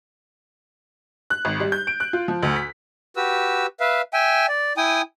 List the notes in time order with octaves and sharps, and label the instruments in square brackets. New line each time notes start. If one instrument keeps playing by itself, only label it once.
[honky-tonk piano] F#6
G#1
G3
G6
D7
F#6
F4
F3
D2
B6
[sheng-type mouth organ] F#4 G4 B4 E6
B4 E5 F5
E5 G5 G#5
D5
E4 G5 G#5 D#6